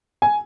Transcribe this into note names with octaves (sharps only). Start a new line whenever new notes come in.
G#5